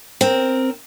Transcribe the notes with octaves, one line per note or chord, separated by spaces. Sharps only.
C4 A#4